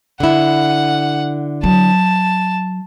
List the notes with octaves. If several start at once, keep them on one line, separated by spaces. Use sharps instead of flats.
D3 E4 F#5
F#3 A5